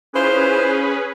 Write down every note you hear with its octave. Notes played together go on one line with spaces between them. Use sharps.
C#4 E4 F4 G#4 B4 C5